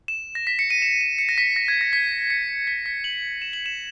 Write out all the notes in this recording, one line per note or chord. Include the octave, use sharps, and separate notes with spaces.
E7
A#6
B6
C#7
D#7
E7
E7
C#7
A#6
B6
A#6
G#6
A#6
B6
C#7
B6
B6
F#7
E7
F#7
E7